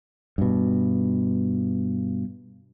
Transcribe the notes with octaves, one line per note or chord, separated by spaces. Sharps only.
G2 B2